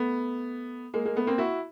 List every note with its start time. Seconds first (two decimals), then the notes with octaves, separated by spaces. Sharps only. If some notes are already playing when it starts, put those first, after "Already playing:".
Already playing: A3 B3
0.94 G#3 A#3
1.05 G#3 A#3
1.16 A3 B3
1.27 A#3 C4
1.38 E4 F#4